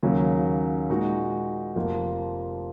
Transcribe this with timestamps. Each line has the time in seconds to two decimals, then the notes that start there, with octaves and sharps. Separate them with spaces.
0.03 D#2 C#3 F#3 A#3
0.90 A#2 G#3 D#4 F#4
1.76 F1 F2 F3 A#3 F4